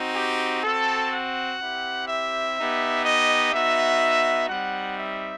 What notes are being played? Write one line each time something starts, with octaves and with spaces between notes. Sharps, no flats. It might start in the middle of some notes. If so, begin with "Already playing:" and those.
Already playing: C4 D#4 F#4
G4
C4 F#4 A4
F#5
C4 E4 G4
E5
B3 D#4 G4
D#5
B3 D#4 F#4 E5
G3 C4 D#4 F#5
E5